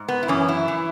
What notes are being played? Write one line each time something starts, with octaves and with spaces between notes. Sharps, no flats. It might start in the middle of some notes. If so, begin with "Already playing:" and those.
Already playing: G#2
B3
E4
F#2 E3 C#4
E4
E3